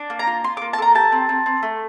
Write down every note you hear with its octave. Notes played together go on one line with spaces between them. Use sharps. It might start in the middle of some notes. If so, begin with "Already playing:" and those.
Already playing: D4
A#3
A#5
F4
F4 C6
D6
A#3
A5
A4 A#5
G4 A5
C4
C4
C4
A3